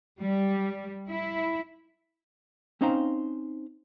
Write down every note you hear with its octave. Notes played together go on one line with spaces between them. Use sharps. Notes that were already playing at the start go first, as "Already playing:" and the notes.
G3
E4
C4 C#4 D#4 C5 F5 A#5